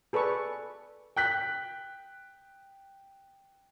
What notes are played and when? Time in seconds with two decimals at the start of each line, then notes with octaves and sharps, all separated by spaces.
0.13 G#4 A4 B4 D5 C#6
1.16 G5 F#6 B6